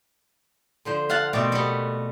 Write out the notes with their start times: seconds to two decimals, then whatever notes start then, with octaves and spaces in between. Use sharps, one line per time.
0.85 D3 F3 C5
1.10 F5 F#5 A5
1.33 B2 A3 C4 D5
1.52 G3 B3 A4